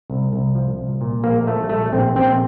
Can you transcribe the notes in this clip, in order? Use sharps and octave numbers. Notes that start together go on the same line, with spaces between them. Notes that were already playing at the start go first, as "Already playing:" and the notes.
C2
C2
F3
C2
A#2
A#1 A#3
F3 A3
A#1 A3
A#1 C4
A#1 C4